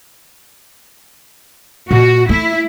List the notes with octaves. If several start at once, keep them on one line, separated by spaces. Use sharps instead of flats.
A#2 F#4
A3 E4